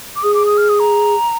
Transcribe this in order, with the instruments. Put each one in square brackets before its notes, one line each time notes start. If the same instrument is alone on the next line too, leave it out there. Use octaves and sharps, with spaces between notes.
[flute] D6
[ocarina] G#4 [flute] D#6
[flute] D6
D#6
F6
D#6
A#5